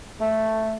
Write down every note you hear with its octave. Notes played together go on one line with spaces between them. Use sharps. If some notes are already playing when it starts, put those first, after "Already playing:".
A3